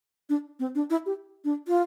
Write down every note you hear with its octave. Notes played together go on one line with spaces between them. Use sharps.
D4
C4
D4
E4
G4
D4
F4